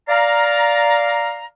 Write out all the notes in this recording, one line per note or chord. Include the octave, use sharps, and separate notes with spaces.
D5 F5 A#5